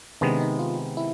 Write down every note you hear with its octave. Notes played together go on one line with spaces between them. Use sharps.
C3 D#3 G#3 B3 D4
D#4
F4
E4